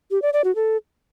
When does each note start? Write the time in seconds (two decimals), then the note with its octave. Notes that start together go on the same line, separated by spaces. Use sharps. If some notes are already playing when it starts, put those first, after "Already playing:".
0.11 G4
0.22 D5
0.33 D5
0.44 F#4
0.56 A4